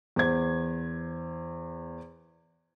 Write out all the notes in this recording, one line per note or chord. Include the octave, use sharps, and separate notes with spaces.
E2 C5 G#6